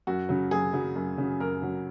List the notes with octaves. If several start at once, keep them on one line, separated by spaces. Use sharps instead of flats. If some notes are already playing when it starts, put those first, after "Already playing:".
F#2 F#4
C#3 F#3
F#2 G#4
C#3 F#3
F#2
C#3 F#3
F#2 A#4
C#3 F#3